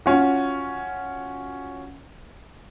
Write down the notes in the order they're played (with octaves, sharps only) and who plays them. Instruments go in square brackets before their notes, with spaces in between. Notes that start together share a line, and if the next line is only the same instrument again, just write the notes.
[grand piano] C#4 F4 F#4